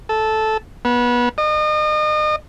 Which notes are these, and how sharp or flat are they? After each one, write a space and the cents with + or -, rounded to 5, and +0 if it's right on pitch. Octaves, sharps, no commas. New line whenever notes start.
A4 -10
B3 -25
D#5 -35